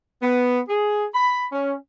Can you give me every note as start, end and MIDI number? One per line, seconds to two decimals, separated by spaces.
0.21 0.59 59
0.68 1.05 68
1.13 1.45 83
1.51 1.73 61